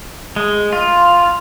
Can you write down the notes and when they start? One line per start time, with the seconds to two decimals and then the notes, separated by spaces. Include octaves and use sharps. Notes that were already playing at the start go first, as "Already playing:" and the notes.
0.36 G#3
0.73 F4